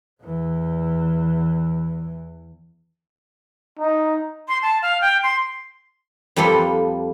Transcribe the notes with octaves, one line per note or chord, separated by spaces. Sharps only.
E2 E3
D#4
C6
A5
F5
G5
C6
F2 G3 A#3 A4 B4 C6